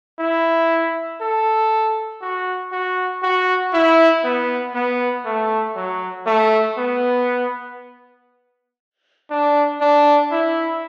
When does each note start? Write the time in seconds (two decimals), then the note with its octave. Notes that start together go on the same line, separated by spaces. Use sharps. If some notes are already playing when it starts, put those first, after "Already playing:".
0.19 E4
1.21 A4
2.22 F#4
2.72 F#4
3.23 F#4
3.73 E4
4.24 B3
4.74 B3
5.25 A3
5.76 F#3
6.26 A3
6.77 B3
9.30 D4
9.81 D4
10.32 E4